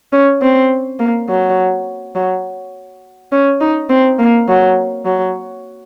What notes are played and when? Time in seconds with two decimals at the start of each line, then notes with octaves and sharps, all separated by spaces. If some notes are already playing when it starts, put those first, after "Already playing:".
0.13 C#4
0.42 C4
0.99 A#3
1.29 F#3
2.15 F#3
3.32 C#4
3.61 D#4
3.89 C4
4.19 A#3
4.48 F#3
5.05 F#3